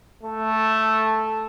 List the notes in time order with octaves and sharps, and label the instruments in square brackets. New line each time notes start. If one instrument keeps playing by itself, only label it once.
[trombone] A3